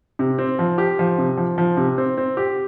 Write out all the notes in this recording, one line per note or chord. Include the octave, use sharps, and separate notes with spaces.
C3
C4
F3
G4
F3
C3
F3
F3
C3
C4
C4
G4